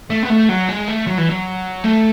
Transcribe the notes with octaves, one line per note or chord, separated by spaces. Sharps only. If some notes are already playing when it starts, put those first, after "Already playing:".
A3
B3
A3
F#3
G#3
A3
F#3
E3
F#3
A3